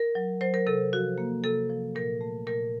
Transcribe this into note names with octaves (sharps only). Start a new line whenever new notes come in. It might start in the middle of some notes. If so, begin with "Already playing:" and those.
Already playing: A#4
F#3
F#3 C5
A#4
C3 A4
F3 F#4
A#3
C3 A4
F3
A#2 A#4
A3
A#2 A#4